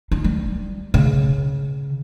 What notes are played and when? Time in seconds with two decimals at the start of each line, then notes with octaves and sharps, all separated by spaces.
0.11 D#4
0.24 G3
0.94 C#3